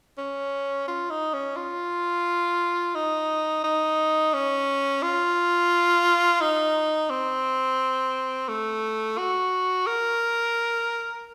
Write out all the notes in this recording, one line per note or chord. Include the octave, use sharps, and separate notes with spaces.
C#4
F4
D#4
C#4
F4
D#4
D#4
C#4
F4
D#4
C4
A3
F#4
A#4